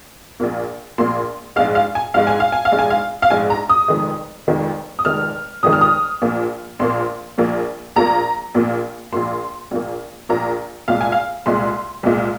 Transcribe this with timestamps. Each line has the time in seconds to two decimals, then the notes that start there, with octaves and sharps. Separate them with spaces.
0.40 A#1 A#2 A#3
0.98 A#1 A#2 A#3 C6
1.56 A#1 G#2 G#3 F5
1.75 F5
1.95 G#5
2.14 A#1 G#2 G#3 F5
2.27 G#5
2.40 F5
2.52 G#5
2.65 F5
2.72 A#1 G#2 G#3
2.79 G#5
2.90 F5
3.22 F5
3.30 A#1 G#2 G#3 G#5
3.50 A#5
3.69 D#6
3.88 F1 F2 D#3 G#3
4.47 F1 F2 D#3 G#3
4.99 D#6
5.05 F1 F2 D#3 G#3 F6
5.63 F1 F2 D#3 G#3 D#6
5.73 F6
5.81 D#6
6.22 A#1 A#2 F3 A#3
6.79 A#1 A#2 F3 A#3 C6
7.38 A#1 A#2 F3 A#3
7.96 A#1 A#2 F3 A#3 A#5
8.54 A#1 A#2 A#3
9.13 A#1 A#2 A#3 C6
9.71 A#1 A#2 A#3
10.29 A#1 A#2 A#3 A#5
10.88 C2 A#2 G#3 F5
11.01 G#5
11.12 F5
11.46 C2 A#2 G#3 C6
12.03 C2 A#2 G#3